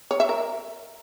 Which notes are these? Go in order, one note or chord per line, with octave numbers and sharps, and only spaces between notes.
C#5
E5
A#4